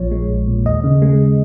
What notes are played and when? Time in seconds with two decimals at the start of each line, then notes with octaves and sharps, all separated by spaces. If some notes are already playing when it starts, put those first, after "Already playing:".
Already playing: A#1 A#2 F3 C#5
0.11 G#3
0.29 A#1
0.48 A#2
0.65 D#2 D#5
0.84 C#3
1.02 G#3